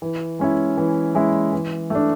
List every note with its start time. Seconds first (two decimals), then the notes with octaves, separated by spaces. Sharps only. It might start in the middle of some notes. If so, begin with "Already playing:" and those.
0.02 E3
0.39 G#3 C#4 E4
0.78 E3
1.15 G#3 C#4 E4
1.52 E3
1.90 A3 D4